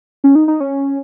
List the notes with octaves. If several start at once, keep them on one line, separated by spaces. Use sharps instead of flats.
C#4
D#4
D#4
C#4